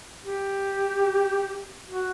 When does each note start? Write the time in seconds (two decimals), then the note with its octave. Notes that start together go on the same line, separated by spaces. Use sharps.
0.25 G4
1.86 F#4